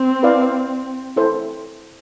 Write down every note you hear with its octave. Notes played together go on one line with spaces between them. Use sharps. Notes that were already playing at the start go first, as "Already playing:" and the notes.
Already playing: C4
E4 B4 D5 F5
E4 A4 C5